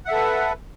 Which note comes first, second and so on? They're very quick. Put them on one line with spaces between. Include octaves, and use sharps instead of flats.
F#5 E5 A4 B4